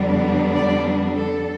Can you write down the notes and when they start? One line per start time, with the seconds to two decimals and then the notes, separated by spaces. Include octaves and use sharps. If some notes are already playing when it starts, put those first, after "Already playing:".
Already playing: F2 D3 G3 B3 D4
0.54 D5
1.16 A4